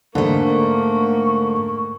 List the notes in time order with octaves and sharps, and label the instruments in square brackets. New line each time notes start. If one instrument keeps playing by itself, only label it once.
[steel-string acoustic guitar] G#2 A3 [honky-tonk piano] D3 [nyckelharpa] A#3 [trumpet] C#6